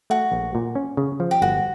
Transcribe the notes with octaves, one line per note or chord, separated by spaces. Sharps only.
A3 F#4
A#1
A#2
C#4
C#3
F3
G4
G1 F#4